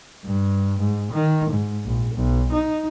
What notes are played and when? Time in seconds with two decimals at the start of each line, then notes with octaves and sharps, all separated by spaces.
0.25 G2
0.80 G#2
1.12 D#3
1.51 G#2
1.85 A#1
2.15 B1
2.52 D#4